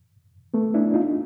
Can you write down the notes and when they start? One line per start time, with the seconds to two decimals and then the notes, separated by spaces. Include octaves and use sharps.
0.54 A3 B3
0.74 D4 E4
0.94 D#4 F4